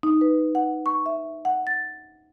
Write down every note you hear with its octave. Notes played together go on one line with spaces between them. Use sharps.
D#4
B4
F#5
C#6
E5
F#5
A6